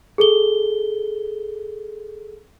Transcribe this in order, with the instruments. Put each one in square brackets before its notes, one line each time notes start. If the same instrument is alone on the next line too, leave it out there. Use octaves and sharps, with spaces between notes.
[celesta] G#4 A4 G7